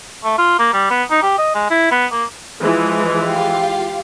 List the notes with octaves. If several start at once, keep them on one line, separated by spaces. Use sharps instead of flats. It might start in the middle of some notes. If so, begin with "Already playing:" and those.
A3
F4
A#3
G3
B3
D#4
G4
D#5
G#3
E4
B3
A#3
E3 F3 G#3
F4 G4 F5